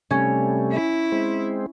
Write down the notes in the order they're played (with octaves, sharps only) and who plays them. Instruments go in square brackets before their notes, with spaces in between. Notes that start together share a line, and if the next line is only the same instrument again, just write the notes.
[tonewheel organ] C3 G3 A3 [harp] C#4
[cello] E4
[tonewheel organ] G#3 C4